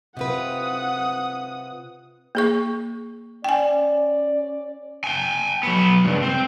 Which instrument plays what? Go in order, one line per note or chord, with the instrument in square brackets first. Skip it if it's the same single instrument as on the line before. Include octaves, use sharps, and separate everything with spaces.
[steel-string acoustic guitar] C3 F4 B4 [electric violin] F#5 D#6
[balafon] A#3 G#4 C#6
[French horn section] C#4 D5 [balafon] G5 G#5
[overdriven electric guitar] G5 G#5
F#3 B3
C#2 G2
C4